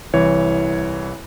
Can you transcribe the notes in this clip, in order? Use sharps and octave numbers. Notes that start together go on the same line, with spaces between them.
C2 E3 C#5